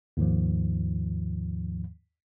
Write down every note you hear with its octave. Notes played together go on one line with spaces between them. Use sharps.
D#2 G#2 D#3 F3